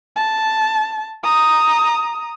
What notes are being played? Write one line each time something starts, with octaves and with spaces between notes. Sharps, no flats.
A5
A#5 D#6